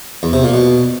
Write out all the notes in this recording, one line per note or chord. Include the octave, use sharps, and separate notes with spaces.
E2
C3
A#2
B2